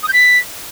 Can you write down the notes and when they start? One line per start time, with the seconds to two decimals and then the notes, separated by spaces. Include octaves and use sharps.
0.03 D#6
0.08 G6
0.13 B6